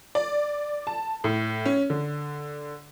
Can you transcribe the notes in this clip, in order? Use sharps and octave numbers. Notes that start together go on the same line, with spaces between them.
D5
A5
A2
C#4
D3